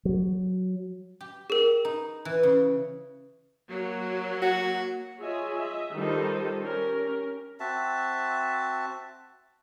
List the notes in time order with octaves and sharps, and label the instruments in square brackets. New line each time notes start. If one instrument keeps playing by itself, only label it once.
[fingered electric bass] F#3
[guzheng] G4
[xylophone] G#4 A#4
[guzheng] D#4
E3
C#3
[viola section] F#3 A#3
[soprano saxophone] F#4
[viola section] F4 G#4 C#5 D#5 E5 G#5
D#5 E5
D#3 G3 D#4 F4 A4 C5
C#4 G4 A#4
[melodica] C4 F#4 E5 A5